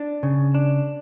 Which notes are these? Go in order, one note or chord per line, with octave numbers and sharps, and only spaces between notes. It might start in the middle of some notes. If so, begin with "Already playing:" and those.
Already playing: D4
C#3
D4